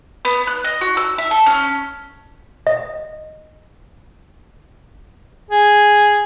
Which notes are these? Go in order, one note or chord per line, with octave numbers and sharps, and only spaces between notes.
B3
F#6
D#5
F#4
E6
E5
A4
C#4
D#5
G#4